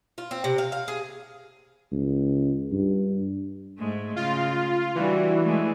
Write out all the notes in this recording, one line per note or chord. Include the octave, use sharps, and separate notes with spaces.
F4
C4
C3
F5
F5
G#4
C#2
G2
G#2 G#3 A3
C#3 F4
E3 G3 D4 F#4
G#3 A3